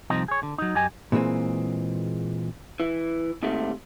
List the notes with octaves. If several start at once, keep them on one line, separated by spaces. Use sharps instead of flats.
C2 F3 C4 D#4 D#5
G#4 C#5
D3
F#3 D#4
F#2 G4 D#5 G#5
A#2 E3 G#3 C4 G#4
E3
D#2 G#2 C3 A3